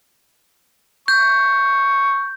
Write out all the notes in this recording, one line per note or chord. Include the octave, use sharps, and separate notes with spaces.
C#6 G6